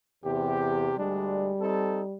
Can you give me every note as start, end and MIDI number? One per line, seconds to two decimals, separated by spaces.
0.24 0.92 40
0.24 0.97 48
0.24 0.97 67
0.97 1.50 38
0.97 2.17 55
0.97 1.50 56
0.97 1.50 62
1.59 2.00 60
1.59 2.00 63
1.59 2.00 69